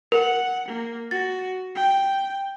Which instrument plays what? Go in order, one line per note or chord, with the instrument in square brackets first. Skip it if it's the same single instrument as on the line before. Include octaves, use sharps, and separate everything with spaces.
[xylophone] A#4 [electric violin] F#5
[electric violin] A#3
[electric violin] F#4 [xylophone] A6
[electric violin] G5